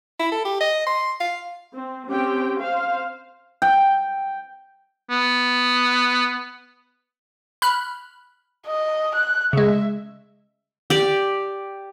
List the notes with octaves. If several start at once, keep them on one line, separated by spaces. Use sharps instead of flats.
E4
A4
G4
D#5
C6
F5
C4
C4 C#4 G4 G5
C5 F5
G5
B3
B5 F6 F#6
D#5
F#6
C#3 G#3 E5
G4 D5